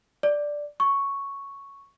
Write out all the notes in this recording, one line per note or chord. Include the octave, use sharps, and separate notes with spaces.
D5
C#6